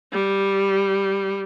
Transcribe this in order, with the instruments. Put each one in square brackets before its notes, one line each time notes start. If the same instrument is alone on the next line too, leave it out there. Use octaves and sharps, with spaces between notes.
[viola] G3